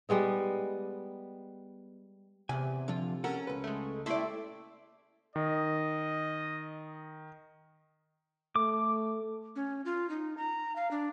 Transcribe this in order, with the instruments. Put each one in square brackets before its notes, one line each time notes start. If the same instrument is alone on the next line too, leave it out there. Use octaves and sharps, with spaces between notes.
[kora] G3 G#3 B3 D#4
[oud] E2 [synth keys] C3 [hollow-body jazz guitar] G#5
[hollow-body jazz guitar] D3 F3 [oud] F4
[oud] C#4 [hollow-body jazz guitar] A4 A#4 F#5
[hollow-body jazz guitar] C#2 B4
[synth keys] G#3 A3
[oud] A3 E4 G4 [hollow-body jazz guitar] A4 D5 [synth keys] E5 C6
[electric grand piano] D#3 [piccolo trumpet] D#5
[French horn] A3 [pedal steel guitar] D6
[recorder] C#4
F4
D#4
A#5
F5
D4